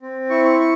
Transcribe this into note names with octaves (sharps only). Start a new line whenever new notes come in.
C4
E4 C#6
C#6
C#6